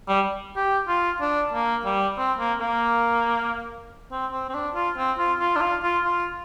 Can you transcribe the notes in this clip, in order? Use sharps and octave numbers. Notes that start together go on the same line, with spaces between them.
G3
G4
F4
D4
A#3
G3
C4
A#3
A#3
C4
C4
C4
D4
F4
C4
F4
F4
D4
F4
F4
F4